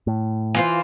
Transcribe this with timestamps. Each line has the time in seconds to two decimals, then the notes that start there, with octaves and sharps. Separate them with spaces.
0.07 A2
0.55 E3 F4 C5